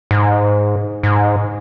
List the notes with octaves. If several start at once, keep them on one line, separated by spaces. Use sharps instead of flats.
G#2
G#2